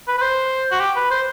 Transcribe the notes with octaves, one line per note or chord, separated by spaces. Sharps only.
B4
B4
C5
F#4
G4
B4
C5